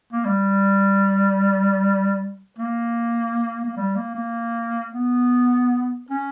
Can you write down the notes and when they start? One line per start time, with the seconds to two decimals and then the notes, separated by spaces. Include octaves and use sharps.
0.13 A#3
0.25 G3
2.59 A#3
3.64 A#3
3.77 G3
3.96 A#3
4.15 A#3
4.93 B3
6.11 C#4